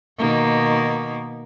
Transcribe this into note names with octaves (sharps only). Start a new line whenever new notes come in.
B2 D#3 A#3